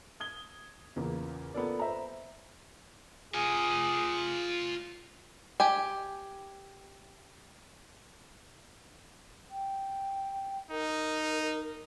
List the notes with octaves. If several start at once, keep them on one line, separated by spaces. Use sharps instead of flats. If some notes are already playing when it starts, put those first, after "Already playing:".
D#6 G#6 G7
E2 A#2 C#3 A#3
A#3 B3 F4 A4 A#4 D5
C5 E5 A#5
F4 G#4 G#5
G4 G5 G#5
G5
D#4 A#4